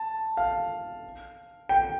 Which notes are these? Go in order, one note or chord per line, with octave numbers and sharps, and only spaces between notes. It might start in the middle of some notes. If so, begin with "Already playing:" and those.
Already playing: A5
F5
G5